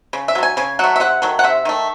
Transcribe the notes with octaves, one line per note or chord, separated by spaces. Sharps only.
C#3
E5
F#3 A3
G#5
C#3 G#5
F#3 A3 F#5
E5
C3 F#5
D#3 F#3 A3
F#5
C3 E5
D#3 A3